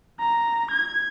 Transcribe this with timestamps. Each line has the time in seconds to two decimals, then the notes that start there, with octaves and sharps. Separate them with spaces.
0.20 A#5
0.71 G#6